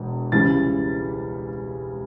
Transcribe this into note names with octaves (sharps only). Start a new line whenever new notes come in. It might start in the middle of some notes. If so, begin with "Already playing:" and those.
Already playing: E1 E2
C#2 C#3 E3 G3 A6